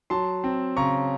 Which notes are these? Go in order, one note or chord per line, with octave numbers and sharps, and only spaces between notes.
F#3 A5 C6
C4
C#3 A#5 C#6